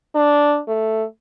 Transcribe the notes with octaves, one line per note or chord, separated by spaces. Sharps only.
D4
A3